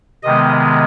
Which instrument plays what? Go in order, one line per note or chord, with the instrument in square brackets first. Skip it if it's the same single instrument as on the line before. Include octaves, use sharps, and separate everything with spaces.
[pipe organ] C3 D#3 G#3 B3 D#5